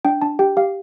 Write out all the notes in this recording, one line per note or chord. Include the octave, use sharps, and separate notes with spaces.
D4 G5
D4 A5
G4 G5
G4 F5